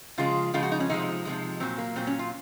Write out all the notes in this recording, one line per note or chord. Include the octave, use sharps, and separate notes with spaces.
C#3 F3 G#3 F4
C#3 F3 G#3 F4
F#4
D#4
C#4
C3 F3 G#3 D#4
C3 F3 G#3
A#2 F#3 C4
A#3
A#2 F#3 C4
C#4
F4